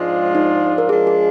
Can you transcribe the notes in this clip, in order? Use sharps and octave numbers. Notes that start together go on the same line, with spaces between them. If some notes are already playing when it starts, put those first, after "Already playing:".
Already playing: G#2 F3 G#3 D4 F4
D#4
A#4
F3 G#3 D4 F4 G#4
G#4